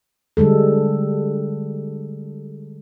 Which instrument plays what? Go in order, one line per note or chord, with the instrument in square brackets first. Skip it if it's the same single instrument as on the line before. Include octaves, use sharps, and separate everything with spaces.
[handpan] D3 G3 G#3 A4